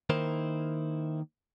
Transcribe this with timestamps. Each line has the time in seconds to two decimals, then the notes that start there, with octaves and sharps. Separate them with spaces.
0.10 D#3 A#3 D#4 E4 A#4 C5